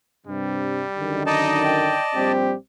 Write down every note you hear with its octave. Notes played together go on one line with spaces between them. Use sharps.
G2 C3 G3
F#2 D3 D#3
D#4 D5 D#5 A5
G5
A#1 G3 C4 G4